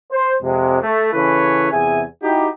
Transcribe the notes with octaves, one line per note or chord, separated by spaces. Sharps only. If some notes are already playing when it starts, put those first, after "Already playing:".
C5
F2 C3 G#3
A3
C#3 E3 E4 A4 B4 C#5
E2 C3 G#4 E5 G#5
D#4 E4 F#4 G4